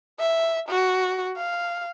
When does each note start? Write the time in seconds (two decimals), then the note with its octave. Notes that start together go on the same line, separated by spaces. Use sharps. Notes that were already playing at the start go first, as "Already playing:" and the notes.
0.20 E5
0.69 F#4
1.37 F5